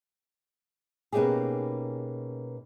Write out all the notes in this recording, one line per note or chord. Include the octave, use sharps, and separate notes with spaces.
B2 A#3 C#4 D#4 G4 G#4